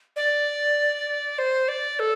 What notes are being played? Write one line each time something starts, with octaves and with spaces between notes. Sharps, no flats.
D5
C5
D5
A4